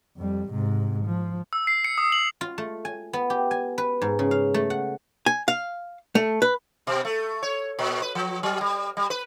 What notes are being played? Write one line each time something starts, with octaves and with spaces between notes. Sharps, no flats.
F2 G3
G#2 C3
F3
E6
C7
C#7
D#6
F#7
F4
A3
G#5
B3
G4
G#5
B4
G#2
C#3
F5
A3
F#5
G#5
F5
A3
B4
B2
A3
C#5
A#2
B4
F3
F#3
G3
G3
B4